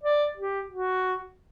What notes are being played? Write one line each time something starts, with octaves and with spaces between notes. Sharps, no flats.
D5
G4
F#4